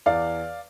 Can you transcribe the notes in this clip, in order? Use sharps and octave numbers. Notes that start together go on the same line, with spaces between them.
E2 D5 F5